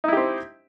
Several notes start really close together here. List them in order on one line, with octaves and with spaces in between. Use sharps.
D#4 E4 G4 C4